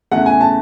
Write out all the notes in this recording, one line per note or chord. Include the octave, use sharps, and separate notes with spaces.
E2 C#3 E3 A3 F#5
G#5
A5